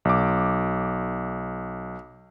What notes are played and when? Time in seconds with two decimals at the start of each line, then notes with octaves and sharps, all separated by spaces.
0.05 B1 D6